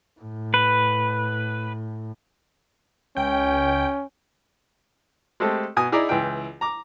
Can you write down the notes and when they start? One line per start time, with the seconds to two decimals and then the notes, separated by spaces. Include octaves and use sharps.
0.20 A2
0.54 B4
3.17 C#2 C#4 G5
5.40 G#3 A3 C4 G4 A4
5.77 B2 G#5 D#6
5.92 D#4 E4 G#4 D5 A#5
6.09 C#2 E3 E4 G5
6.61 A#5 D6